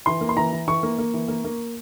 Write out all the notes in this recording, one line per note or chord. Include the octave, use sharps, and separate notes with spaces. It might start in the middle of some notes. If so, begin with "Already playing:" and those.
E3 C6
A#3
C6
E3 A#5
E3
E3 C#6
A#3
A#3
E3
A#3
A#3